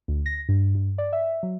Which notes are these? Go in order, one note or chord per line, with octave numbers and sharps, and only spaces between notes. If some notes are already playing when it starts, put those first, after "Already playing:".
D2
A#6
G2
G2
D5
E5
F#3